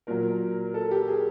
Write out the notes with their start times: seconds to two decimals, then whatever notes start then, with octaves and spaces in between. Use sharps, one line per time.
0.07 A#2 F#3 A#4
0.74 A4
0.91 G4
1.08 G#4